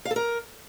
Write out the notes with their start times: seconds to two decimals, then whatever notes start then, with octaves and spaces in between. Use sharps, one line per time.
0.05 F5
0.11 A4
0.16 A#4